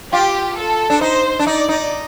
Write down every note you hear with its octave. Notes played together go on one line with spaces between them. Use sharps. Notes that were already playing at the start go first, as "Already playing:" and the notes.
F4 G4
A4
D4
D#4 C5
D4
D#4 D5
D#4